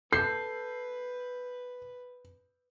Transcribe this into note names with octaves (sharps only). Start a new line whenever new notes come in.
A4 B4 G6 C7